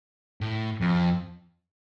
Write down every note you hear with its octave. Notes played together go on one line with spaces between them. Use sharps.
A2
F2